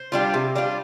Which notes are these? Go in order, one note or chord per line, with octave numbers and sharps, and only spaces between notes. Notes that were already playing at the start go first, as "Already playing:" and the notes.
Already playing: C5
G3 D4 F4
C3
G3 D4 F4